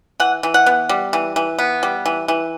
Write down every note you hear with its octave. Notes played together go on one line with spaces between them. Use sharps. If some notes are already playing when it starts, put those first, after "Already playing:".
E3 F#5
E3
F#5
B3
G3
E3
E3
B3
G3
E3
E3